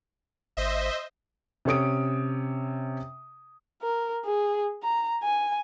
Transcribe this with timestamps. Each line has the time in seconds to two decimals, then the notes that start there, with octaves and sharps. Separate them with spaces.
0.57 G#1 C5 D#5 E5
1.65 C3 C#4 C#5 D#6 D7
3.82 A#4
4.25 G#4
4.83 A#5
5.23 G#5